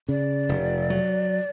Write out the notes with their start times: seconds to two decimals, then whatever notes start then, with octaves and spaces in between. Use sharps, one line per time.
0.08 C#3 D5
0.49 F1
0.90 F#3